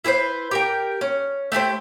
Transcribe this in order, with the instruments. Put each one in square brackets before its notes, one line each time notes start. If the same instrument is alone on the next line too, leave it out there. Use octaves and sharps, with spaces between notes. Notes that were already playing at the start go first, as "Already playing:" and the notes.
[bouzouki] E4 G#4 B4 C5
G4 A#4 G5
C#4
A3 E4 G4 C5